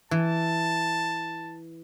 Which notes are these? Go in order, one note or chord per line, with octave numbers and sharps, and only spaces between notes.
E3 A5